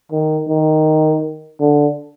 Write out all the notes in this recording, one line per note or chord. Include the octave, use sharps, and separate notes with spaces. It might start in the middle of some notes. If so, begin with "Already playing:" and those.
D#3
D#3
D3